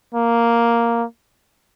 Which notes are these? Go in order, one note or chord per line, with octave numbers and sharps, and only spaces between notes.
A#3